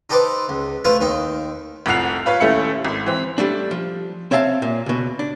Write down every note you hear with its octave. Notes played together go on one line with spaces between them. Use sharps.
D#4 G4 A4 B4 C5 D6
C#2
A3 E4 F4 B4 C5 F5
D#2 D#4 G5
F1 C2 F3 F#5 C7 F7
F4 B4 C#5 F5
D#2 A3 C#4 E4 C#7
G#1
E3 C4
G3 A3 D4
F3
C4 C#5 E5 F5 A5
A#2
C#2 B2
D4